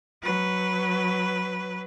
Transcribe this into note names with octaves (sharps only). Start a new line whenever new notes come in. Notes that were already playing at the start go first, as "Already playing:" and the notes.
F#3 B4